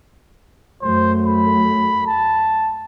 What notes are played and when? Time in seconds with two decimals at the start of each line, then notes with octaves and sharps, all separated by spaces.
0.82 F#2 F#3 A3 C5
1.26 B5
2.07 A5